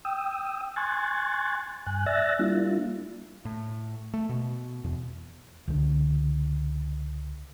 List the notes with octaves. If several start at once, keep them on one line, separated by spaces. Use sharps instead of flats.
G5 D#6 E6
G#5 C6 C#6 F#6 G#6 A6
G2 G#5 F#6
D5 E5 E6 F#6 A6 A#6
G3 A#3 D4 E4 F4
A2
A3
B2
E2
C#2 D3